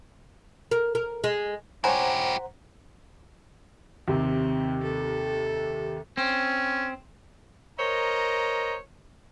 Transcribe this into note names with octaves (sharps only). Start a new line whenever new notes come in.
A#4
A#4
G#3
E4 G4 C5 C#5 F#5 G#5 A#5
D#2 C3 C4
A4
C4 C#4
A#4 C5 C#5 D#5 A#5